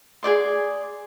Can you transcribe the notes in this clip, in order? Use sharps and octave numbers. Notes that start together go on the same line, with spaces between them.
G#4 C5 D5 C6